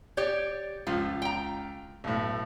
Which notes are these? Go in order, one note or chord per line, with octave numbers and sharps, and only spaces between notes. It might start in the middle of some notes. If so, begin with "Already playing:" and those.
G4 C#5 D5
C#2 F3 F4
G5 A#5
B1 A2